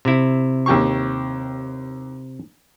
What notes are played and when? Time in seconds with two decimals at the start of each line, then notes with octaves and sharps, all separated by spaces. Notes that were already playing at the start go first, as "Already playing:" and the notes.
0.05 C3 E4
0.66 D#2 G4 C#6